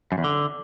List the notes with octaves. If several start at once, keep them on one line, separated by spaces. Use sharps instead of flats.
F#2
E2
D3